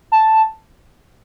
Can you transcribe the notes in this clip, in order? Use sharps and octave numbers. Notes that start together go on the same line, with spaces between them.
A5